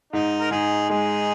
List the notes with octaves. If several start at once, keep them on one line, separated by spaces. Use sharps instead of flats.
G#2 D#4
A#4
G#2 D#4 G#4
G#3 D#4 G#4